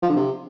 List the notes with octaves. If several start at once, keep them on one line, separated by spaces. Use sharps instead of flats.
F3
D3
C3